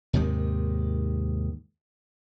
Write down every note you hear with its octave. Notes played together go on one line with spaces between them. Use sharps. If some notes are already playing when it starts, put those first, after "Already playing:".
D#2 G#2 C3 D#3